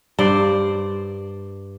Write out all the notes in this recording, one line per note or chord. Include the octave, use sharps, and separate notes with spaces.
G2 C5 D5